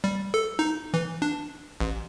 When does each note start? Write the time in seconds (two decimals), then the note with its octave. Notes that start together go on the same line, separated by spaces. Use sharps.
0.04 G3
0.34 A4
0.59 D#4
0.94 E3
1.22 D4
1.80 A1